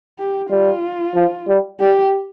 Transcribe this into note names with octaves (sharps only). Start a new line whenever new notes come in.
G4
G3 F4
F3
G3
G3 G4